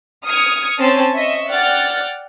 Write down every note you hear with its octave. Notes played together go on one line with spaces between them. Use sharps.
D#6 F6 G#6 C#7
C4 C#4 G#5 A5
D#5 E5 C#6
D5 F#5 G5 F6 A6